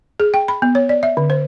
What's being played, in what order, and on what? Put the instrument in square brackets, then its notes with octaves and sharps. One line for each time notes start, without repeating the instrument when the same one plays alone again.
[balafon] G#4
G5
B5
B3
C#5
D5
E5
D3
C5